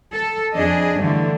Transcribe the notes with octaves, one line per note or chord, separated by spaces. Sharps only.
A4
F2 D4 G#4 D#5
G2 D3 E3 A3